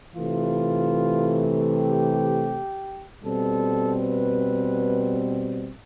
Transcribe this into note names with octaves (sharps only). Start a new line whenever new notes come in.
C3 E3 A3 F4
G4
B2 G3 C4 A4
B4